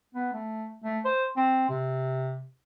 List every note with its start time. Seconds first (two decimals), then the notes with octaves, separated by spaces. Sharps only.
0.15 B3
0.33 A3
0.84 A3
1.05 C5
1.37 C4
1.69 C3